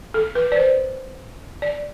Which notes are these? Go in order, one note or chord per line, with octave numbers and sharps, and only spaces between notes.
A4
B4
D5
C5
D5